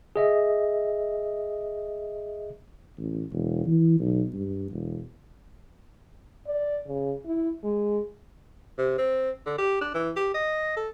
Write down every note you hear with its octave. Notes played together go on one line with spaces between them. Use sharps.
G#4 D#5 E5
A1
E1
E3
B1
G2
E1
D5
C#3
E4
G#3
C3
C4
D3
G4
D4
E3
G4
D#5
A4